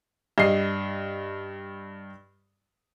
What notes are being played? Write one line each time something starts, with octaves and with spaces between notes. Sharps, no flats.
G2 D#5 C7